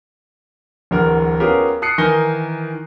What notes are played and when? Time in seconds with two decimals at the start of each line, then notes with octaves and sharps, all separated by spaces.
0.91 D1 E2 D3 A#4
1.40 B3 C#4 F4 G4 G#4 A#4
1.82 A5 D#6 F#6 C7 C#7
1.98 D#3 E3 A#4 G#5 A#6 G7